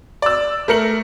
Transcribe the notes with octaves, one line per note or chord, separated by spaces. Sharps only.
D5 E6
A3 A#4 C#7 F#7